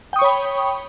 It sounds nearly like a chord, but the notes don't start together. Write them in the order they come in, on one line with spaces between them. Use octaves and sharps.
G5 D#6 C#6 C#5 B5